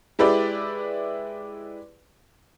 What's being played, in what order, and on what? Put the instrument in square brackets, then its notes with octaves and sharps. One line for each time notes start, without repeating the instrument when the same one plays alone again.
[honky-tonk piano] G#3 E4 G4 B4 D5